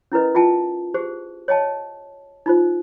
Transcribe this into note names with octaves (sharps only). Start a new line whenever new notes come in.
C#4 E4 A#4 B4 D#5
F4 E5 G5 A5
G4 G#4 C5
C#5 D#5 G5 A5
D#4 F4 C5